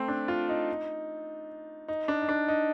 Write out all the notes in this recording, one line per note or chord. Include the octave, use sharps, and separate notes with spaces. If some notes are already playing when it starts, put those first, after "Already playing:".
Already playing: A3 C4
D4
F4
D#4
D#4
D4
D#4
D4
D#4